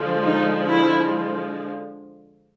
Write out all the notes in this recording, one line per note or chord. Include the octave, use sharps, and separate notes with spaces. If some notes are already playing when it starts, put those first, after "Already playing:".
Already playing: D3 F3 G#3
D#4
E4